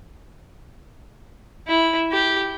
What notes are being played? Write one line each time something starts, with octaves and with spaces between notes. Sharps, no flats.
E4
G4